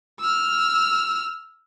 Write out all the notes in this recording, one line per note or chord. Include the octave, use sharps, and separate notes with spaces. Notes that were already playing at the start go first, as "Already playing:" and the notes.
E6 F6